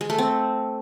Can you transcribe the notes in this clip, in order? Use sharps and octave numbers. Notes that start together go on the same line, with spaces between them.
G#3
A3
C4